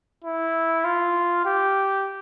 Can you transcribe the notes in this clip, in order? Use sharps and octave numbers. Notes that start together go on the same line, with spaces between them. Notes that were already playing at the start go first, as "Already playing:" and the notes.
E4
F4
G4